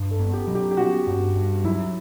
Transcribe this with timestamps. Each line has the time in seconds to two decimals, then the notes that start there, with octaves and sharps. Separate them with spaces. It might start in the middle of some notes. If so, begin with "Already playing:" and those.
Already playing: G2
0.11 A4
0.19 B3
0.34 G4
0.47 F#3
0.55 G4
0.71 G4
0.77 B3 F#4
1.07 G2
1.35 G2
1.64 F#3 E4